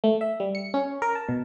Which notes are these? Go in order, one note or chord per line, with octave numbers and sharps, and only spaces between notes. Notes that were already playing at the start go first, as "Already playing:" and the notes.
A3
E5
G3
C#7
C#4
A#4
A5
B2